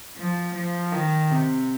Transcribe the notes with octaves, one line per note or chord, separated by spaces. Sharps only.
F3
F3
D#3
C3